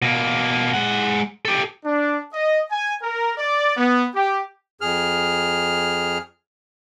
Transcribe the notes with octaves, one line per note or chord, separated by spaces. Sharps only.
B2 A#3
G#3 F#5
G4 A4
D4
D#5
G#5
A#4
D5
B3
G4
F2 G#4 F6